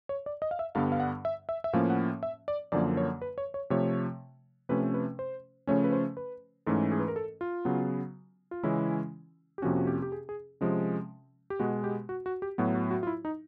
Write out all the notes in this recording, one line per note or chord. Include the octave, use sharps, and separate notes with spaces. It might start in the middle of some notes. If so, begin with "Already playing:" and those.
C#5
D5
D#5
F5
E5
G2 D3 G3 B3 F5
F5
F#5
E5
E5
E5
A2 F3 A#3 C#4 F5
F#5
E5
D5
F#2 D3 F3 A#3 D5
C#5
B4
C#5
C#5
C3 F3 A3 C#5
C3 F3 A3 C#4 B4
B4
C5
C#3 F3 A3 C#4 C#5
B4
C5
B4
G#2 E3 A3 C#4 A4
G#4
B4
A#4
A4
F4
C#3 F#3 B3
F4
C#3 E3 G#3 C#4 E4
G4
F2 C3 F3 A#3 C#4 F#4
F#4
G4
G4
G#4
G#4
C3 F3 G#3 C#4
G4
B2 G#3 B3 F#4
G4
F#4
F#4
G4
A2 F#3 B3 F#4
F#4
F#4
F4
E4
D#4